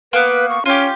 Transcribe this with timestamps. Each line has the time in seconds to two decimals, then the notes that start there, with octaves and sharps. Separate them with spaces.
0.13 A#3 B3 B4
0.49 C#6
0.66 C#4 F4 G4